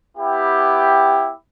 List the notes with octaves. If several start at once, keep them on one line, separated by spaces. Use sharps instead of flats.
B3 E4 G4